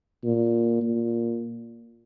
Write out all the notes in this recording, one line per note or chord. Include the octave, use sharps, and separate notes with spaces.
A#2
A#2